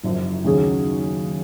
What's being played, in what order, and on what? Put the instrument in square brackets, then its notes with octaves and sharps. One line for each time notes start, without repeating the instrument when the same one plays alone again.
[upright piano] F#1 F#2 F3
D#2 C#3 F#3 C#4 G#4